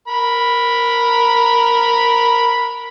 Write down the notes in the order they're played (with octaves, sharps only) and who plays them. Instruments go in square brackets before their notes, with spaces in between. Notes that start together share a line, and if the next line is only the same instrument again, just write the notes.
[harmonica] A#4 B5